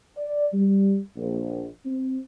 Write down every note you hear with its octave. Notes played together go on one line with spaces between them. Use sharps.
D5
G3
A#1
C4